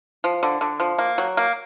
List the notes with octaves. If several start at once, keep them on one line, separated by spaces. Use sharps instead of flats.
F3
D3
D3
F3
A#3
F#3
A#3